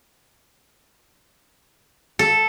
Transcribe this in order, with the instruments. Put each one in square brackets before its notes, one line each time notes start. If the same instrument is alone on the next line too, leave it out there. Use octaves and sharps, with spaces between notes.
[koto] A4